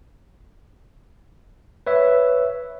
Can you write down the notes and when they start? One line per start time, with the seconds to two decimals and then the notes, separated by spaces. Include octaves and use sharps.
1.87 B4 C#5 E5